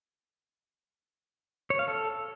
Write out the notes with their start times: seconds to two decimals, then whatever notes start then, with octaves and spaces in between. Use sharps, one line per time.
1.70 C#5
1.79 F5
1.88 A4